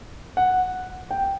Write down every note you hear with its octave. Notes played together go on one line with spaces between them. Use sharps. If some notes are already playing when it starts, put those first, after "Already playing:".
F#5
G5